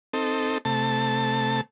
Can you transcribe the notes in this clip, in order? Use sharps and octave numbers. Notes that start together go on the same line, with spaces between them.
C4 D#4 A4
C3 A3 A5